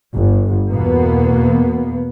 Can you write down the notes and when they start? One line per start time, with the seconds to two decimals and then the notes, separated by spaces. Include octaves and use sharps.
0.15 G1
0.70 E2 B2 A#3 B3